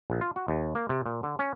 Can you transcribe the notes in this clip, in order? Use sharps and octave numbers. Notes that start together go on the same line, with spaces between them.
A#1
F4
F#4
D#2
A#3
C3
A#2
D3
C#4